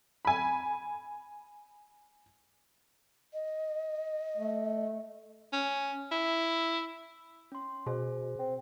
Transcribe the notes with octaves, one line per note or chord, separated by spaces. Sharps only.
G#5 B5
D#5
A3
C#4
E4
C#4 C6
B2 G#4 C5
C4